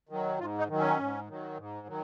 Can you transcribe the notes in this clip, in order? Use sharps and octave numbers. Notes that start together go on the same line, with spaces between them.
D#3 F#3
G#2 F4
D#4
D#3 F#3
C#4
G#2
D#3 F#3
G#2
D#3 F#3